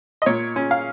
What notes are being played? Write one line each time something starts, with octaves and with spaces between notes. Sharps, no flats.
D#5
A#2 C#5
C#4
F5